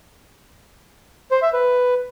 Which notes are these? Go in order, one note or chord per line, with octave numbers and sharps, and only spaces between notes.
C5
E5
B4